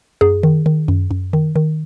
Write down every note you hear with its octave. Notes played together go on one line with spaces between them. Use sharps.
F#2 G#4
D#3
D#3
F#2
F#2
D#3
D#3